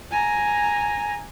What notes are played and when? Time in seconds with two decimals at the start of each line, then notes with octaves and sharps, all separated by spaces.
0.11 G#5 A#5